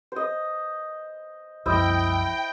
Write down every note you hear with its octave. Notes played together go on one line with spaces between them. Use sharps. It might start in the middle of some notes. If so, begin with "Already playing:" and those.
C5 D#5
C2 F#2 F3 E4 C5 D#5 G5